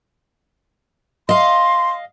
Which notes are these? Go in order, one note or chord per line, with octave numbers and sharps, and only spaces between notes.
D#5 F5 C6